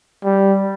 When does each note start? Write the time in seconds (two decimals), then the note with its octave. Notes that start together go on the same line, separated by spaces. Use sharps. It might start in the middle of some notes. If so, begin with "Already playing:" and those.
0.24 G3